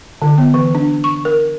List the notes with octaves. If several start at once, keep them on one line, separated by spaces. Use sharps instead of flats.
D3
B3
E3
D4
C#6
A#4